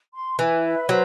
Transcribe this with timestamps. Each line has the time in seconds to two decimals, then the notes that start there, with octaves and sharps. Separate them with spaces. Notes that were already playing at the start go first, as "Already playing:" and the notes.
0.14 C6
0.39 E3 E5
0.64 B4
0.89 F#3 C5